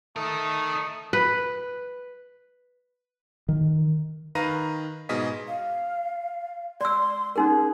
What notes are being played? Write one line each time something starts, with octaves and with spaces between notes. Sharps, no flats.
A3 D#4 A#4 D#6
B4
D#3
D#3 B4 F5 A#5 A#6 D#7
G#2 B2 G#4 D#5 G#5 B6
F5
D5 C6 E6
C#4 D#4 G#4 A#4